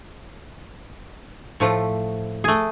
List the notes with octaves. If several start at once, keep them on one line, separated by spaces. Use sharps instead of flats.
A2 F3 A3
A3 G#4